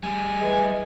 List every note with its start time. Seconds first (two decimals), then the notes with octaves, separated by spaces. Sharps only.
0.03 G3 G#4 G#5
0.41 E3 G#3